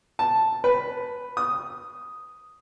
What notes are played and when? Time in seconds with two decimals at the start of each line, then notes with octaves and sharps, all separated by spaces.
0.19 A5
0.64 B4
1.37 D#6